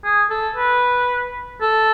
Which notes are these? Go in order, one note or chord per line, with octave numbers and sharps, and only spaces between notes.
G#4
A4
B4
A4